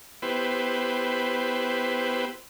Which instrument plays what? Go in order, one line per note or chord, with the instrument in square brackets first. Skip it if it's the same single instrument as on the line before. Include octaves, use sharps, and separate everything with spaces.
[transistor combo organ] B3 E4 G4 B4 C5